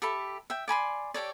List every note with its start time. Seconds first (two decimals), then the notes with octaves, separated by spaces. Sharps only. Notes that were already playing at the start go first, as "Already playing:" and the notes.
0.02 G4 A4 E5 B5
0.50 E5 G5
0.68 D5 G#5 B5 C6
1.14 G4 A4 C#5 D5